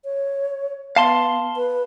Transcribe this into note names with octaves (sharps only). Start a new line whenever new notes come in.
C#5
B3 F5 A5 C6
B4